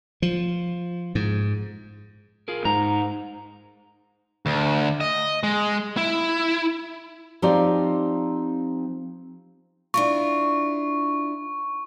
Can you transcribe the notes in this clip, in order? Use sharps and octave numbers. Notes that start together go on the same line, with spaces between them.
F3
G#2
F4 G#4 A#4
G#2 A#5
D2
D#5
G#3
E4
F3 C4 D#4 G4 C5 D5
D4 E4 F4 C#6